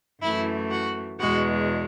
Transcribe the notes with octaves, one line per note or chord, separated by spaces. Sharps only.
F#2 E3 A3 E4
F#4
E2 B2 G#3 F#4